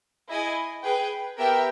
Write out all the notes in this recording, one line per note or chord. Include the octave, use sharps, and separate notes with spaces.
E4 G#4 D#5 G#5
G#4 B4 G5
B3 G4 A#4 E5 G5